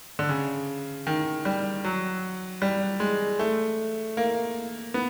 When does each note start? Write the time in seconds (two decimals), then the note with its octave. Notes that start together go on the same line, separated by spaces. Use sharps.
0.19 D3
0.29 C#3
1.07 D#3
1.45 G3
1.84 F#3
2.62 G3
3.00 G#3
3.39 A3
4.17 A#3
4.94 B3